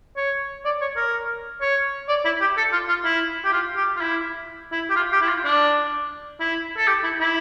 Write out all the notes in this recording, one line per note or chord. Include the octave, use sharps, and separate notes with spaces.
C#5
D5
C#5
A#4
C#5
D5
E4
G4
A4
F4
F4
E4
G4
F4
G4
F4
E4
E4
G4
F4
G4
E4
F4
D4
E4
A4
G4
E4
E4